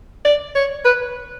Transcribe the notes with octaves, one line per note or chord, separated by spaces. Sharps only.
D5
C#5
B4